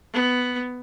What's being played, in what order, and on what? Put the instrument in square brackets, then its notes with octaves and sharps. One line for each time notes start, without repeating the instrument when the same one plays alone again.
[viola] B3